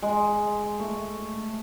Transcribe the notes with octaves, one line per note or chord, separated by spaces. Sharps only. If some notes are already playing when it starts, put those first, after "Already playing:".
G#3
A3